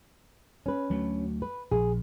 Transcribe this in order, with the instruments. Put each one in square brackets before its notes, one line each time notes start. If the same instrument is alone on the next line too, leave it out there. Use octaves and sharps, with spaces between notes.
[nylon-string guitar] C#4 B4
[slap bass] D2 F#3 A3
[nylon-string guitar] B4
[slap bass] A#1 [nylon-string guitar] G#4